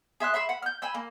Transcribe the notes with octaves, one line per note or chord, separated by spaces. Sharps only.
G#4 E5 C6 F#6
E5 B5 C6 E6
F#5 B5
F6 G6
G#5 B5 E6 G6
A#3